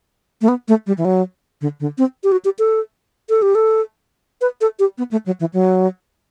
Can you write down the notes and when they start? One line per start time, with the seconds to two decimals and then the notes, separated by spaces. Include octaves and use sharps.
0.41 A3
0.48 B3
0.68 A3
0.87 G3
0.98 E3
1.05 F#3
1.61 D3
1.80 D3
1.98 C4
2.24 G4
2.32 F#4
2.45 G4
2.59 A4
3.29 A4
3.42 G4
3.55 A4
4.41 B4
4.61 A4
4.79 G4
4.98 B3
5.11 A3
5.26 F#3
5.40 E3
5.53 F#3